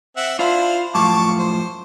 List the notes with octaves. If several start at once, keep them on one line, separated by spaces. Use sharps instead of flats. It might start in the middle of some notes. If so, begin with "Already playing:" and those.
C4 E5 F#5
D4 E4 F4 C5
F#2 A2 F3 A5 C#6 D6
C5